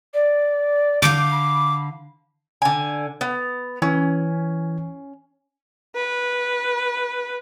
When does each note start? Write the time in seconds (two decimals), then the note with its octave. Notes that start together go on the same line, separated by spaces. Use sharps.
0.13 D5
1.02 D3 F5 D6 G6
1.31 B5
2.62 D3 G#5
3.21 B3
3.82 E3 C#4 G#5
5.95 B4